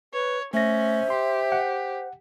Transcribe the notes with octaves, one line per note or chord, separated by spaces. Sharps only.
B4 C#5
A3 C#4 C5 E5 A#6
G4 C6
F#5